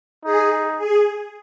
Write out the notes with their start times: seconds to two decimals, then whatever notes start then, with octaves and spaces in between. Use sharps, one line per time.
0.24 D#4 G#4
0.78 G#4